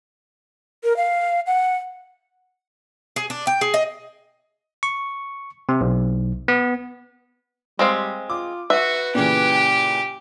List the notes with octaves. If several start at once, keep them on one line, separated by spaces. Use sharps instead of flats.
A#4
F5
F#5
G#4
D4
G5
G#4
D#5
C#6
C3
B1
B3
G3 G#3 C4 F5
F4 D6
F#4 B4 E5
A#2 C#3 E3 G4